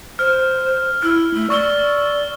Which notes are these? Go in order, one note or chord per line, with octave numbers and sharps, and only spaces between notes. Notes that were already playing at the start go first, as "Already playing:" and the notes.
C5 F6
E4 E6 F6
A3
D5 C#6 E6 G7